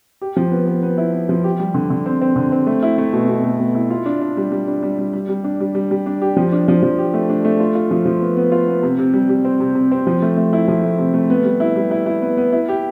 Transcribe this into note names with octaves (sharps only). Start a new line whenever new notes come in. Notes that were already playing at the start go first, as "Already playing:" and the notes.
G4
F3
B3
B3
B3
E4
B3
F3
G4
G3
D3
D3
C4
C4
D3
C4
A3
E4
A3
B2
B2
A3
B2
E4
F4
D4
D4
G3
G3
D4
G3
G3
G3
G3
D4
G3
G3
G3
D4
G4
F3
D4
F3
F3
G4
A3
D4
A3
F4
F4
F3
F3
B3
B3
F4
B3
C3
C3
G3
G3
C4
C3
C3
C4
F3
A3
A3
E4
F3
A3
C3
A3
B3
G3
E4
G3
E4
E4
B3
B3
E4
G4